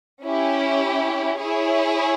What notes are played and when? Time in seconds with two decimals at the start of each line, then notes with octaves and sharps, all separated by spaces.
0.23 C#4 E4 G4
1.37 E4 G#4 C#5